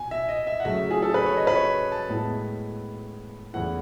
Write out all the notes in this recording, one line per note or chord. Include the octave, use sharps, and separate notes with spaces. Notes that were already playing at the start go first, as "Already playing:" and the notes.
Already playing: B2 G#5
E5
D#5
E5
F#5
C#3 F#3 A3 E5
G#4
A4
B4
C#5
D#5
B4
C#5
A5
A2 G#3 B3 E4
E2 C#3 E3 A3 E4 F#5